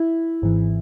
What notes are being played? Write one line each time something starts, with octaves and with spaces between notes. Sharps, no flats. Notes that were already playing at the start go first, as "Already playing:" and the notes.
Already playing: E4
G#1 G#2 E3